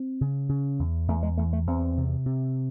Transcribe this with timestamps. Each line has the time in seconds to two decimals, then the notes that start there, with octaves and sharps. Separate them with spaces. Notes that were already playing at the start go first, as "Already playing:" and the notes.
Already playing: C4
0.21 C#3
0.49 C#3
0.79 E2
1.08 E2 A3
1.23 G#3
1.37 E2 A3
1.53 A3
1.67 E2 C4
1.97 C3
2.26 C3